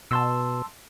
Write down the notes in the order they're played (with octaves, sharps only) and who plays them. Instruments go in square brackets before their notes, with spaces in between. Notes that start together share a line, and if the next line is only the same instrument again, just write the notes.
[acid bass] B2 [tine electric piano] A5 C6 E6